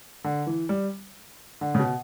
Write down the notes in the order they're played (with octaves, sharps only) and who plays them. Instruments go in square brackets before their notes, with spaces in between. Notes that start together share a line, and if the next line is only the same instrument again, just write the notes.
[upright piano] D3
E3
G3
D3
C#3
B2